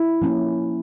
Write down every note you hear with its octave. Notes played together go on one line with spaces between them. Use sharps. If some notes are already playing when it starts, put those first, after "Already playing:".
Already playing: E4
F3 A#3 C#4